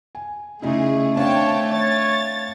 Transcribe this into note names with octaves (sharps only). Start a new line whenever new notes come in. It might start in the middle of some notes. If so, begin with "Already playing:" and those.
G#5
C#3 A3 D#4 E4 G#4
C4 D4 C#5 F5 G5 A5
C#5 A6